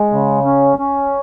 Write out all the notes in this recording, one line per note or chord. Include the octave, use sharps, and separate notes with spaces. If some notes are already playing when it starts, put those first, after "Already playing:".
Already playing: G#3
C#3
C#4
C#4